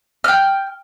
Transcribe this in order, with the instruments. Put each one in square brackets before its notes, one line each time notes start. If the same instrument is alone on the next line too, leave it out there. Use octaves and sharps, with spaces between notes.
[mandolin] G5 F6